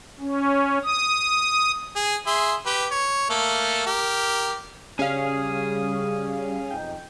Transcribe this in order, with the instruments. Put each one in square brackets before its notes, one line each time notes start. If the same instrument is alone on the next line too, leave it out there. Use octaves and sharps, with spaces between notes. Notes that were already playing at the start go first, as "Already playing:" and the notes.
[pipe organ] C#4
D#6
[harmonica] G#4
G#4 E5 C6
G4 B4
C#5
A3 A#3 A4
G4 A#4
[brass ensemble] C#3 [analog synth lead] G3 [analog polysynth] C#4 F5 [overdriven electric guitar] G#4
[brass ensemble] B1 F2 D#4 [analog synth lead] G5